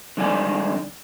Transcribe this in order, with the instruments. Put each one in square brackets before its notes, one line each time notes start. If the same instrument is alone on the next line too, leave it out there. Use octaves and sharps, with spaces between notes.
[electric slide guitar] D3 G3 G#3 D#4 D5 G#5